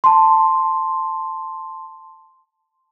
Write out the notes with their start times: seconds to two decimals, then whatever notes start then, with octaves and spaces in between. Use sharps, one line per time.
0.04 A5 C6